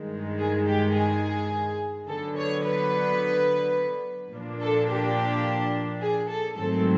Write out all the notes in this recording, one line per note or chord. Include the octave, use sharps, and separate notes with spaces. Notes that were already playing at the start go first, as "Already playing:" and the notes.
Already playing: G2 D#3 G#3
G#4
G4
G#4
D3 F#3 B3 A4
C#5
B4
A#2 F3 A#3 D4
A4
G4
G#4
A4
G#2 D#3 F#3 A3 C4 A4